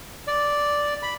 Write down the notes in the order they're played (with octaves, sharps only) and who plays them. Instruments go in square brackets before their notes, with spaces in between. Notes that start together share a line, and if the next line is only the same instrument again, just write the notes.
[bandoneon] D5
B5